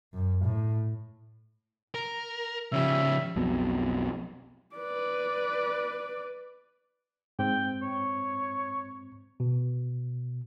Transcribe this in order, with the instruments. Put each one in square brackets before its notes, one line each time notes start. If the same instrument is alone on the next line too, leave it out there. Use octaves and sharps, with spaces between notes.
[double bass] F#2
A2
[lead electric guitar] A#4
[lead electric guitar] C#3 F3 [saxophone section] G3 C#4 E5
[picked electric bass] B1 F2 B2
[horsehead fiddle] B4 D5
[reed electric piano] G#2 C4 [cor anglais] G5
[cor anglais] C#5
[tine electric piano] B2